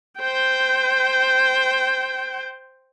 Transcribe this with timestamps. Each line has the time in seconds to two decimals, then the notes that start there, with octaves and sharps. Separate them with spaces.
0.20 C5 G5